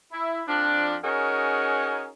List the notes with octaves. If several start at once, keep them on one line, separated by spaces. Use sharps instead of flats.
E4
F2 F3 D4
C#4 D#4 F#4 G#4 A#4